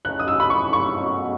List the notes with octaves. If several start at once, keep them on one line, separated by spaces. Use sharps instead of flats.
C#3 E3 A3 D#4 F#6
D#6
E6
B5
C#6
C#6
B2 F#3 C#4